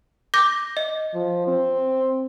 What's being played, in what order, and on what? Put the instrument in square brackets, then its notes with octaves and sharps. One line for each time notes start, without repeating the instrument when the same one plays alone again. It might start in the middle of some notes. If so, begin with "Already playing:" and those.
[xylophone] D6 G6 A#6
D#5
[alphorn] F3
C4